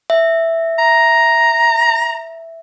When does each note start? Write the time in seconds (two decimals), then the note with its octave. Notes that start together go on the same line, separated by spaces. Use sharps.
0.10 E5
0.79 A#5